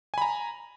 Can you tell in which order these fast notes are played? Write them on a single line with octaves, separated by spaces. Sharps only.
G#5 B5 A#5